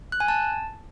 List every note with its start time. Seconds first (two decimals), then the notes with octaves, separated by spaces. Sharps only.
0.12 F#6
0.20 G#5
0.28 A5